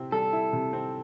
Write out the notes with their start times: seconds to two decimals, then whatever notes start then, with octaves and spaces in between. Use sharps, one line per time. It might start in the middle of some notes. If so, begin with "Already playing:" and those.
Already playing: C3 C4 E4
0.12 G3 A4
0.33 E4
0.53 C3
0.73 C4